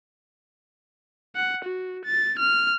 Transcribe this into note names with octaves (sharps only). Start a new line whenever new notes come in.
F#5
F#4
A6
F6